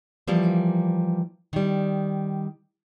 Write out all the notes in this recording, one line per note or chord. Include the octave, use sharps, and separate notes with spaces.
E3 F3 G3 A#3
D#3 G3